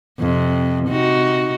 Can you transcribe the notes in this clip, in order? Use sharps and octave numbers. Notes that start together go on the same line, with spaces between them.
F2 C3
C3 D#4 F#4